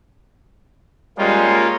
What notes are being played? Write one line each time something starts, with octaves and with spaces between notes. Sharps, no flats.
G3 G#3 A#3 C#4 F4